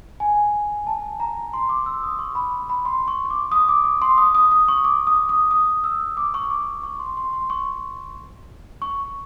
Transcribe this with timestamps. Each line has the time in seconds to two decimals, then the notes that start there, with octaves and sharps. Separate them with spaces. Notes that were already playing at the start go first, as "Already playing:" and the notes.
0.20 G#5
0.87 A5
1.20 A#5
1.54 C6
1.69 D6
1.86 E6
2.03 D#6
2.19 C#6
2.35 B5
2.70 B5
2.85 C6
3.08 C#6
3.25 C#6
3.30 D6
3.52 D#6
3.69 D6
3.84 D6
4.02 C6
4.18 D#6
4.35 D#6
4.51 D#6
4.68 C#6
4.84 D6
5.07 D#6
5.29 D#6
5.51 D#6
5.84 E6
6.17 D6
6.34 C#6
6.51 D6
6.83 C#6
6.99 C6
7.17 C6
7.33 C6
7.50 C#6
8.82 C#6